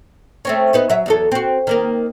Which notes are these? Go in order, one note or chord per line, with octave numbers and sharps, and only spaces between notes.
A3 C4 C#4
B3 D#4 B4
F#3 E5
E2 F#3 A4
C4 F#4
D#3 A#3 A#4